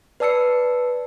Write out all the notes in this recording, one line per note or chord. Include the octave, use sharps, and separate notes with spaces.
B4 D5 A5 E6 C7 C#7